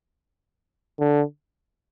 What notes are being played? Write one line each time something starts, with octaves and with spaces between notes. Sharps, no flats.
D3